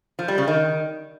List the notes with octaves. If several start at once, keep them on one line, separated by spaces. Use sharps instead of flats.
F3
G3
C#3
D#3